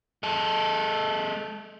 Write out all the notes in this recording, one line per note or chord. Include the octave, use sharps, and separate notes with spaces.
G#3 A4